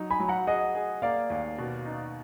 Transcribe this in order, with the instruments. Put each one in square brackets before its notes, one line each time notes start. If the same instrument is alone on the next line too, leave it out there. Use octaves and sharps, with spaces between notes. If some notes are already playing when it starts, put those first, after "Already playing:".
Already playing: [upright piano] F#3 D#4
[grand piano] G#5 B5
[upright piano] F#3
[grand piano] F#5 A#5
[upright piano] G#4 [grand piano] D#5 F#5
[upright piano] G#4
[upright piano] A#3 [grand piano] D5 F5
[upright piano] D#2
B2
D#4